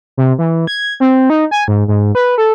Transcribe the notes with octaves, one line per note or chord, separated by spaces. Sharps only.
C3
E3
G#6
C4
D#4
G#5
G#2
G#2
B4
A4